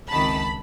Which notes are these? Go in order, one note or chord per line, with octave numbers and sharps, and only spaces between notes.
C#2 C3 D#3 A5 B5